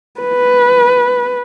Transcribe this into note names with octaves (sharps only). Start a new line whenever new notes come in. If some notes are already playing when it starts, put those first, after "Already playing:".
B4